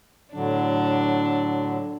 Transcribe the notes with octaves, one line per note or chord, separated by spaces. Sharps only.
A2 D3 F#3 D4